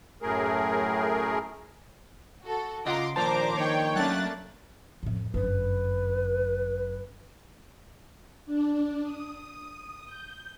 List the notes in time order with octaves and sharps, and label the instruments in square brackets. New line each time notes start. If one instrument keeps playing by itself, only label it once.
[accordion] F#2 A2 A3 G#4 A#4
[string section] F#4 A4
[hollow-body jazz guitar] C#3 D#5 F#5 [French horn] F4 [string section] A#5 C6 D6
[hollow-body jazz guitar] D#2 F3 A5 [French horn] A#2 [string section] D4 [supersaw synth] C5 A#5 D6
[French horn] D#3 [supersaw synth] C#5 G5
[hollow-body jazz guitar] F#3 C#4 [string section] A3 A#3 D4 [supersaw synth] F#6 A6
[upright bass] F2 A2
[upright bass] G1 F#2 [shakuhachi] B4
[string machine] D4
D#6
G6